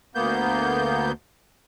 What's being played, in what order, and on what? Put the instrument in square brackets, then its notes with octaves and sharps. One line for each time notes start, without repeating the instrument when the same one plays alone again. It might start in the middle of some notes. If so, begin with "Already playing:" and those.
[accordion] D2 A#3 B3 G6